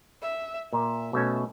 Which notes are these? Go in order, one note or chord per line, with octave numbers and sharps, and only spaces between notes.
E5
A#2 E5
B2 A3 C#4